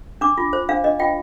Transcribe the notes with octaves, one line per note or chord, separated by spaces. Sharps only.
D4 D6
F4
C5
D4 F5
D4 D#5
F4 G5